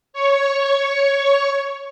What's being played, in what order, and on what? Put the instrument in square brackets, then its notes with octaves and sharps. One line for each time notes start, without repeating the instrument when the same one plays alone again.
[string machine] C#5 C#6